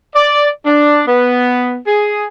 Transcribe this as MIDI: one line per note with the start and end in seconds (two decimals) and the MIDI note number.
0.14 0.48 74
0.66 1.01 62
1.07 1.78 59
1.87 2.25 68